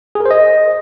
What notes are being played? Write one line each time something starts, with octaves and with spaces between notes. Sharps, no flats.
G#4
A#4
C5
D#5